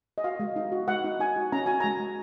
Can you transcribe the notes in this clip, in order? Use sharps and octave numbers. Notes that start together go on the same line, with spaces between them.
D#5
F#4 F5
G#3
D#4
F#4
G#3 F#5
D#4
D#4 G#5
F#4
C#4 A#5
F#4 G#5
G#3 A#5
G#3